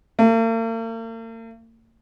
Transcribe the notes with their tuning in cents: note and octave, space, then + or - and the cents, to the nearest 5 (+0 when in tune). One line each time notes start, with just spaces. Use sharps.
A#3 -45